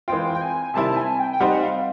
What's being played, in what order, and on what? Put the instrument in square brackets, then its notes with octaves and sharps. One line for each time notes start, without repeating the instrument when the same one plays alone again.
[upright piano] E3 G#3 C4 F4 [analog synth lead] G5
[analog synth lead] G5
G#5
[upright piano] C3 D#3 G3 C4 E4 [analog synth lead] A5
[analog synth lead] G#5
G5
G5
[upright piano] G3 C4 D#4 [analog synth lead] F#5
[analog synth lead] F5